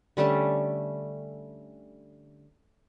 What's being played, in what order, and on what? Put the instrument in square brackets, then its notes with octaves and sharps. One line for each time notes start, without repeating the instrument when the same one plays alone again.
[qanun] D3 G3 A3 C#4